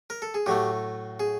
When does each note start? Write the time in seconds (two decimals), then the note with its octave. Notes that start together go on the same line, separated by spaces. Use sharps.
0.10 A#4
0.22 A4
0.34 G#4
0.46 A2 F#3 A3 G4
1.20 G#4